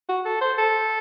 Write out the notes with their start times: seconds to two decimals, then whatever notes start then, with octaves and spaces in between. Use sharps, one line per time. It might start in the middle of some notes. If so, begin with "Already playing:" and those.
0.09 F#4
0.25 A4
0.41 C5
0.58 A4